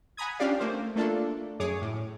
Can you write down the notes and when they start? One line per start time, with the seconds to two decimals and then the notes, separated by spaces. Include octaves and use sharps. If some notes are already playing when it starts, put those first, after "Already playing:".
0.17 F#5 G#5 A#5 B5 D#6 G#6
0.39 C#4 D4 F4 G4 D5 F5
0.60 A3 A#3 C5
0.96 A3 A#3 D4 F4 A4
1.60 F#2 G#4 C#5 D6 D#6
1.81 A2